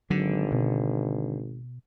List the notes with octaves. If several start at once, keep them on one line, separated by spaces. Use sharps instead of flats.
G#1 D3 F#3
B2